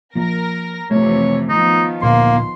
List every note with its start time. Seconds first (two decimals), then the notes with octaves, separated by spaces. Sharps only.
0.15 F3 A#3 A#4 A#6
0.91 F2 C3 E3 A3 C#5
1.49 D#3 F3 B3 D#4
2.02 D2 A#2 A#3 D4 C6